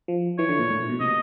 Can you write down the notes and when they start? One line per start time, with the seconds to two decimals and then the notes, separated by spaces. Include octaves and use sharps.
0.08 F3
0.38 E3 C#5
0.49 D3
0.59 A#2
0.70 A2
0.80 A#2
0.89 B2
1.00 C3 D#5